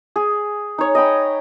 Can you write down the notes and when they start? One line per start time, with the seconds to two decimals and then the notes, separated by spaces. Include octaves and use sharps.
0.16 G#4
0.78 D#4 C#5
0.95 D#5 G5 B5